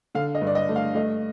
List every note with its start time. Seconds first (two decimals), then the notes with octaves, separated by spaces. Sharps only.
0.15 D3 F5
0.35 D#5
0.41 G2
0.47 D5
0.55 D#5
0.69 A3
0.76 F5
0.95 A3 D#5